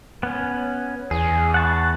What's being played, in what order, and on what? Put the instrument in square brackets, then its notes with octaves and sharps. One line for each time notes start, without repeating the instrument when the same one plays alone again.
[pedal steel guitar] B3 C#4
[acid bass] E2 [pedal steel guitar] G#4
[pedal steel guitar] F#5 A5 C#6